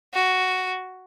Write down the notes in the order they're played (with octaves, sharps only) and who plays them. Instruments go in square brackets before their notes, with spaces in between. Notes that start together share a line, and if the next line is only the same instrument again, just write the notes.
[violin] F#4